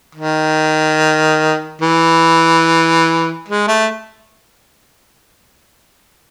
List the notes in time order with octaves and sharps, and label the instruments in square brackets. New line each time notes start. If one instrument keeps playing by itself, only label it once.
[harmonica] D#3
E3
G#3
A3